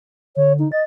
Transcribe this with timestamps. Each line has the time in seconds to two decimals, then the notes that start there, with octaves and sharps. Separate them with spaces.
0.36 D3 C#5
0.59 D#4
0.72 D#5 A6